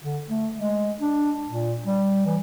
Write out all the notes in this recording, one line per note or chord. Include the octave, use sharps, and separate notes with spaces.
D3
A3
G#3
D4
A#2
G3
E3